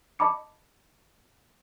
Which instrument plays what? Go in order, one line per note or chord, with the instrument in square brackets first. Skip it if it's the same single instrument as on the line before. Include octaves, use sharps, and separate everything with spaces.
[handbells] D#5 A5 B5 D6 C#7